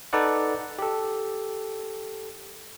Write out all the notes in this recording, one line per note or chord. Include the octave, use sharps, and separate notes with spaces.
D#4 A4 B4 D5 F#5
G4 A4